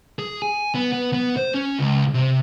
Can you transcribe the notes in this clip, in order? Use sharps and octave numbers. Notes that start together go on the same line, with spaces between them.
G#4
G#5
B3
B3
B3
C5
C#4
C#2
C3